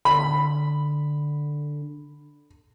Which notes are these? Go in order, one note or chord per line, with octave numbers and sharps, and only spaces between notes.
D3 B5